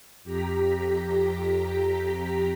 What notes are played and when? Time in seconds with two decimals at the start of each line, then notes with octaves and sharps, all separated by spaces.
0.24 F2 G4 A#5 B6